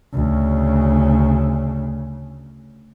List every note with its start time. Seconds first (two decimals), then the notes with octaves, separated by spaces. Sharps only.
0.13 D2 C#3